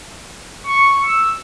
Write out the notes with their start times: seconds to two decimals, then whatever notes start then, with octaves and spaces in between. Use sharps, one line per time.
0.67 C#6
1.04 E6